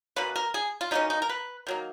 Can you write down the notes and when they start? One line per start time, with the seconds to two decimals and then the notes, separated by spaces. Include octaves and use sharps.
0.16 B2 A#3 C#4 B4
0.36 A#4
0.54 G#4
0.81 F4
0.91 B2 A#3 C#4 D#4
1.10 D#4
1.22 A#4
1.29 B4
1.67 D#3 F#3 A#3